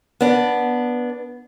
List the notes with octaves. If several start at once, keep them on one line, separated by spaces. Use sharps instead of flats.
B3 D4